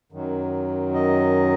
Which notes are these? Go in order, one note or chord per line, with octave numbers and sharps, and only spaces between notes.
F#2 D#3 F#3
D#5